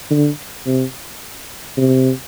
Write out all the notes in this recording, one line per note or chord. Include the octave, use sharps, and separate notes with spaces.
D3
C3
C3